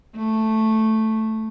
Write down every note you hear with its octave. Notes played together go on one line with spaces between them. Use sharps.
A3